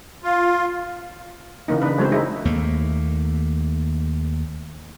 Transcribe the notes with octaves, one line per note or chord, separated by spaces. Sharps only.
F4
C#3 E3 A#3 D#4
C#3 D4 B4
C#3 F#3 G#3 A3 C4 C5
G#3 D#4 E4
D#2 A3 A#3